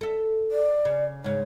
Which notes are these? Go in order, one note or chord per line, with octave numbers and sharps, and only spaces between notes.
A4 E5
D5
C#3
G#2 C#3 C#5